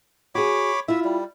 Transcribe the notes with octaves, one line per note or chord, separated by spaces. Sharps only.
F#4 G#4 C#5 B5 D6
E4 F4 E5
G3